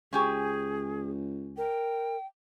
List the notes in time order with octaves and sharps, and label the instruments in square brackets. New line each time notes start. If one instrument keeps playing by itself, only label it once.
[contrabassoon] C#2 [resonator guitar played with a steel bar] C#4 G4 G#5 [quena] G#4
[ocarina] A#4 [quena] G5